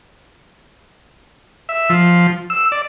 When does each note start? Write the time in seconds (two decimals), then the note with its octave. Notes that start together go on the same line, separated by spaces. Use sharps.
1.69 E5
1.90 F3
2.50 E6
2.72 D5